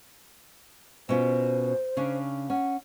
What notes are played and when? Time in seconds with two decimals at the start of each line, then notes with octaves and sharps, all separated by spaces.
1.09 B2 C#4 F4 C5
1.97 C#3 C#4 D4
2.50 C#4 F#5